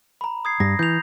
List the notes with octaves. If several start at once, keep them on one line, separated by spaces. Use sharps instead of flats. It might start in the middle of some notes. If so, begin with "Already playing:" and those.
A#5 B5
D#6 G#6 C7
G2 A#6
E3 G6 F7